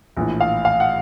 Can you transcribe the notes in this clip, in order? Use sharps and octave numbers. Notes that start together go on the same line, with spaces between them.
A#1 A2 E3
F5
F5
F#5